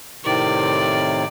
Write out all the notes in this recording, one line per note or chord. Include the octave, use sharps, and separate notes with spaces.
A2 C3 D#3 D5